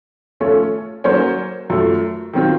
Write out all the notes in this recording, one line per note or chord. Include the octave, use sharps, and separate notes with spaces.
F3 A3 C#4 F4 A4
F#3 A#3 C#4 F#4 C5
F#2 F3 A3
D#3 F#3 C4 F4